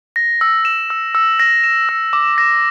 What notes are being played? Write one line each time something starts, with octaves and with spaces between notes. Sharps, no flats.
A#6
E6
E7
E6
E6
A#6
E7
E6
D6
A#6